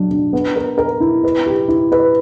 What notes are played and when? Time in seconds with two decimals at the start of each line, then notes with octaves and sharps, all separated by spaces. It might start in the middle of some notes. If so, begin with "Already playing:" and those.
Already playing: F#3 D4
0.11 D4
0.33 B3
0.56 A#4
0.78 A#4
1.00 E4
1.24 B4
1.46 G4
1.68 E4
1.92 B4